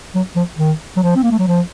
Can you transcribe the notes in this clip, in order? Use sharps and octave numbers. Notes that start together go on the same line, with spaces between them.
F#3
F3
D#3
F#3
F3
C4
A#3
A3
F#3
F3